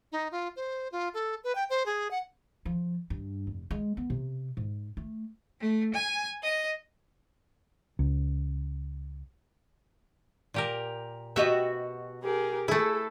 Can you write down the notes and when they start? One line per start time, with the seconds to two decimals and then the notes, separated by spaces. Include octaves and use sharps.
0.12 D#4
0.32 F4
0.56 C5
0.92 F4
1.14 A4
1.44 B4
1.55 G5
1.70 C5
1.86 G#4
2.11 F#5
2.65 F3
3.10 G2
3.47 F1
3.71 G#3
3.97 B3
4.10 C3
4.57 G#2
4.97 A3
5.60 A3
5.93 G#5
6.42 D#5
7.99 C#2
10.54 A#2 G4 A#4
11.36 B2 F#4 G4 D#5 E5
12.23 G4 G#4 A#4
12.68 A3 E4 G#4 A4